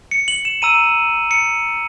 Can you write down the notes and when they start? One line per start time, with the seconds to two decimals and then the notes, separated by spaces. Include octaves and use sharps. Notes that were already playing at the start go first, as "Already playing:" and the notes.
0.11 C#7
0.28 F#7
0.45 E7
0.62 A#5 E6 D#7
1.31 C#7